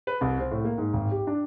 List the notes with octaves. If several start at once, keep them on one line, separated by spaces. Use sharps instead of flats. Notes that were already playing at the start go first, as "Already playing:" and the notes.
B4
C2
C4
A2
A#3
G#2
G#1
G4
D4